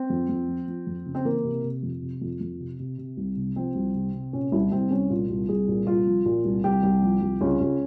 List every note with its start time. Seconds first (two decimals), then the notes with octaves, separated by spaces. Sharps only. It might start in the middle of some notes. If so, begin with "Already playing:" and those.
Already playing: C4
0.10 F2
0.29 F2
0.48 F3
0.68 F3
0.87 F2
1.06 C#3
1.15 C4
1.25 E3 A#3
1.45 C3
1.64 C3
1.83 F2
2.02 C3
2.22 F2
2.41 F2
2.60 C3
2.79 C3
2.98 C3
3.17 C2
3.37 C3
3.56 F3 C4
3.75 C2
3.94 C3
4.14 C3
4.33 A#2 C#4
4.52 C2 E4
4.71 C2 C4
4.91 C2 C#4
5.10 A#2 F4
5.29 C2
5.49 C2 G#4
5.68 A#2
5.87 C2 F4
6.06 F3
6.25 A#2
6.45 C2
6.64 C2 G4
6.83 C2
7.02 F3
7.22 C2
7.41 C#2 C#4
7.60 C#2